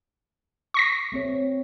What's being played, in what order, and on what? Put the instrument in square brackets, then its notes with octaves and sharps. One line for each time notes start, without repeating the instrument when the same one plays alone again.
[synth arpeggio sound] C#6 A#6 B6
[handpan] A3 C4 C#5